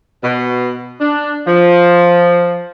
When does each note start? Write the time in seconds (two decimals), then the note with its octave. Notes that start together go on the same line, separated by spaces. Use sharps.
0.24 B2
1.01 D4
1.47 F3